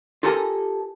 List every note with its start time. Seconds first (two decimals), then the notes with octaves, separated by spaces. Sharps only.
0.23 F4 G4 A4 A#4 G#5 A#5